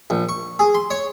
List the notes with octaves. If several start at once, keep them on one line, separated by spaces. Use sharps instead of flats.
A#1
C#6
G#4
C6
C#5